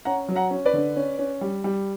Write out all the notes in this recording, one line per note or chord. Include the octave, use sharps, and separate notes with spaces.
C#4 F#5 A#5
F#3
F#5 A#5
C#4
B4 D5
D3
C#4
C#4
G3
G3